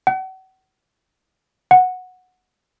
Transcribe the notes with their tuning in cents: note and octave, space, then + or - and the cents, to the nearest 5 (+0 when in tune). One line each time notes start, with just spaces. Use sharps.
F#5 +40
F#5 -10